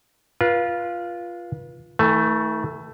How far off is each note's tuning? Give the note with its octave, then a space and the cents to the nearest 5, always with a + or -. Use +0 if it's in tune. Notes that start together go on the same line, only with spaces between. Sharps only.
F4 -5 B4 -35
E3 -45 A3 +5 A5 -40